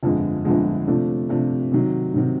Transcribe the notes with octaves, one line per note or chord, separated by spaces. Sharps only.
G1 F2 D3 F3 G#3
G1 F2 D3 F3 G#3
C3 F3 A3 D4
C3 F3 A3 D4
C3 D#3 F#3
C3 D#3 F#3